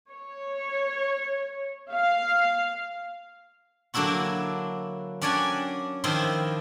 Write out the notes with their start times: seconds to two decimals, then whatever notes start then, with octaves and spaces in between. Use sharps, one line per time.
0.11 C#5
1.90 F5
3.94 D3 F#3 A#3 D4 E4 F#4
5.22 C#4 D4 D5 F#5 G#5 A#5
6.04 D#3 F3 D4 E4 D#5 C6